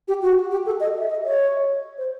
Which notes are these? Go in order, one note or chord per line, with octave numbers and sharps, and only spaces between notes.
G4
F#4
G4
A4
D#5
E5
D#5
C#5
C5